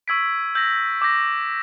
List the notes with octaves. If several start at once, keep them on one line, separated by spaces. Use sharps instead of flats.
C#6 E6 G#6 B6 D7
E6 G6 A#6
D6 G6 A#6